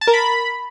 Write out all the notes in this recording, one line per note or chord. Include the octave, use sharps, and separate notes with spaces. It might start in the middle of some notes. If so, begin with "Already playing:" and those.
A5
A#4
B5